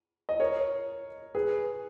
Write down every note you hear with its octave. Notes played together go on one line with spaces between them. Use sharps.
D#5
A#4 C#5
G#4 B4